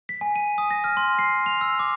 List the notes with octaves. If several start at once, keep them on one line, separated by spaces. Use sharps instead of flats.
B6
G#5
D#7
D#6
A#6
F6
C6
C7
F7
E6
D6